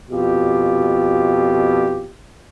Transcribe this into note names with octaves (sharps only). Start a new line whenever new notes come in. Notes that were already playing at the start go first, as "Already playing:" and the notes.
F2 B2 F4 G4